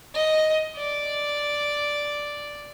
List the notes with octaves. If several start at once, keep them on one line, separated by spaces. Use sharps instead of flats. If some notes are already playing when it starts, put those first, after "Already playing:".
D#5
D5